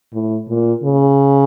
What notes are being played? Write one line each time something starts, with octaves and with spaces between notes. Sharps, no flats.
A2
A#2
C#3